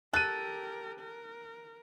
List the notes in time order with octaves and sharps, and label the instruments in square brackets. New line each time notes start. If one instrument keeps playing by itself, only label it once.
[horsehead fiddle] G4 A#4 [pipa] A4 [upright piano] F#6 D#7
[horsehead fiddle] A#4